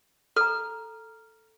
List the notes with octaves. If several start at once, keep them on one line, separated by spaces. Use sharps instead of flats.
A4 A#5 F6